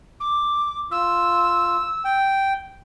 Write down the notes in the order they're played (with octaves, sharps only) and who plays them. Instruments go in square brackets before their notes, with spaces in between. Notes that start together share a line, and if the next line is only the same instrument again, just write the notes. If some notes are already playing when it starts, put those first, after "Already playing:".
[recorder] D6
[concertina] F4 [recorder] E6
[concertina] G5